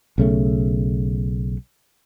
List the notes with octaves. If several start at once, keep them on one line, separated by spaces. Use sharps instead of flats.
B1 C#3 A3